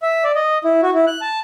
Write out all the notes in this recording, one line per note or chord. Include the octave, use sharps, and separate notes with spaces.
E5
D5
D#5
E4
F#4
E4
F#6
A5